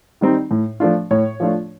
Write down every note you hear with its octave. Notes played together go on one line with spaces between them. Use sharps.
D#3 G3 C4 D#4
A2
F3 A3 D4 F4
A2 C#5
F3 A3 D4 F4